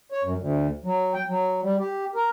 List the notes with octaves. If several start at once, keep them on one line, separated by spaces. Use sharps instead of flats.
C#5
F#2
D2
F#3
G5
F#3
G3
G4
A#4